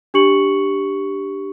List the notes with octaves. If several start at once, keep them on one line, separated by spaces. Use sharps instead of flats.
D4 G4 C#6 C#7 F#7